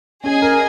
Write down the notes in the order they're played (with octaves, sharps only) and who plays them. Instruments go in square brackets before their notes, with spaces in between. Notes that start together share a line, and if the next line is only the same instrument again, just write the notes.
[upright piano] C#4 [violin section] G#4 D#5 G#5
[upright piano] A#4